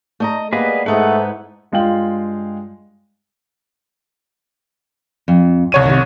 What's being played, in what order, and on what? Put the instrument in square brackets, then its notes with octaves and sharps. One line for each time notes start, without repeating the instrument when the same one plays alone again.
[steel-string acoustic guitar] A3 D#5 A#5
[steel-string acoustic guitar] G3 A#3 B3 [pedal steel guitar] G#4 B4 D#5
[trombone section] G#2 [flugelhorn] A3 [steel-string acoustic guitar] B3 D#4 E4 [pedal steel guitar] F#5
[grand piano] G2 G#3 F4 F5 G5 F#7
[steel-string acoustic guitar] F2
[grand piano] C2 C#5 D#7
[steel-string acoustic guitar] C3 D#3